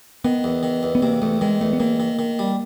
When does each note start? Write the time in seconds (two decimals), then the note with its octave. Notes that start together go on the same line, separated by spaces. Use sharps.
0.25 D#3 B3
0.44 E2
0.63 D#3
0.83 E2
0.95 B3
1.02 C3 A#3
1.22 E2 A3
1.41 D#3 G#3
1.61 E2 A3
1.73 B3
1.80 D#3 A#3
2.00 D#3
2.19 D#3
2.39 G3